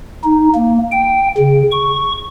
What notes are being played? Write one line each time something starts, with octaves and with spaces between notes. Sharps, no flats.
D#4
A#3
G5
C#3
C#6